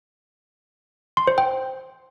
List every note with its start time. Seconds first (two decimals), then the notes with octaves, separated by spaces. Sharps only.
1.17 C6
1.27 C5
1.38 G5